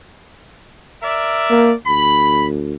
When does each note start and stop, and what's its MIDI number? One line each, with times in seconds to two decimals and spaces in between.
1.03 1.74 70
1.03 1.74 74
1.03 1.74 76
1.50 1.73 58
1.87 2.74 38
1.87 2.45 83